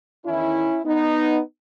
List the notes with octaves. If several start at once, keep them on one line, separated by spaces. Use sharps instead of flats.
E2 D#3 C#4 E4
B3 D#4